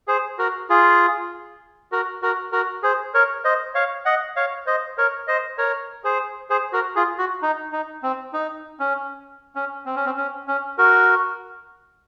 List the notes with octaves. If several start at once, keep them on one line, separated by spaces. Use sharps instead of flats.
G#4 C5
F#4 A#4
F4 G#4
F#4 A#4
F#4 A#4
F#4 A#4
G#4 C5
A#4 C#5
C5 D#5
C#5 F5
D#5 F#5
C#5 F5
C5 D#5
A#4 C#5
C5 D#5
A#4 C#5
G#4 C5
G#4 C5
F#4 A#4
F4 G#4
F#4
D#4
D#4
C4
D#4
C#4
C#4
C4
C#4
C4
C#4
C#4
F#4 A#4